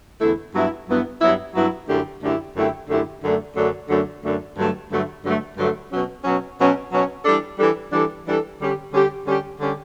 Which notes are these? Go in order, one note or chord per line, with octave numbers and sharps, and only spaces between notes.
E2 D3 A3 E4
G2 F#3 B3 E4
G2 F#3 B3 E4
G2 F#3 B3 E4
G2 F#3 B3 E4
F#2 D3 A3 E4 G4
F#2 D3 A3 E4 G4
F#2 D3 A3 E4 G4
F#2 D3 A3 E4 G4
F#2 D3 F#3 A3 D4
F#2 D3 F#3 A3 D4
F#2 D3 F#3 A3 D4
F#2 D3 F#3 A3 D4
G2 D3 F#3 A3
G2 D3 F#3 A3
G2 D3 F#3 A3
G2 D3 F#3 A3
B2 F#3 C#4
B2 F#3 C#4
B2 F#3 C#4
B2 F#3 C#4
E3 G3 D4 A4
E3 G3 D4 A4
E3 G3 D4 A4
E3 G3 D4 A4
D3 G3 C#4 G4
D3 G3 C#4 G4
D3 G3 C#4 G4
D3 G3 C#4 G4